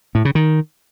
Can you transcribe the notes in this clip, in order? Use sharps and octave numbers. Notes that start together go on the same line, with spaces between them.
A2
C#3
D#3